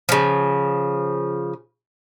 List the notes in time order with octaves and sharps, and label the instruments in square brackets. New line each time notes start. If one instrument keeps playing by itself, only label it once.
[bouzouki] C#3 F3